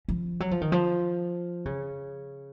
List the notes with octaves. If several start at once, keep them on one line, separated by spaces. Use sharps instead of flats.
F3
F#3
F3
D#3
F3
C#3